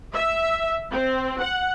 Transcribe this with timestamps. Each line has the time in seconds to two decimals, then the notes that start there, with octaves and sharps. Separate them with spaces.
0.14 E5
0.91 C4
1.41 F#5